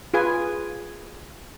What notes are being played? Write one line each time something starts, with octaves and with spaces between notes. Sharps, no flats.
F4 G#4 B4 G#5